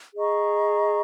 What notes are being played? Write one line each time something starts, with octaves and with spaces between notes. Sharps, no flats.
G#4 D#5 A#5 C#6